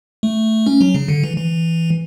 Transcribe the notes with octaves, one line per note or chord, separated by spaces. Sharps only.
A3
C#4
F#3
C#3
D3
E3
E3